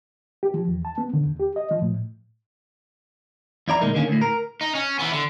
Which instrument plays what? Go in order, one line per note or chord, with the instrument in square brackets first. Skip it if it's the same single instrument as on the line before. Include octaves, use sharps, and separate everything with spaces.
[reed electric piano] G4
F3
E2
A5
B3
D3
D#2
G4
D#5
F3
A2
[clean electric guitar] F2 E4 D5 A#5
D2 A#2 G#3 D#4 A#4
D3 D#3 A#3 C4 C#4
D2 A2
A#4
[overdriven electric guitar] D#4
C#4
E3 B3
D3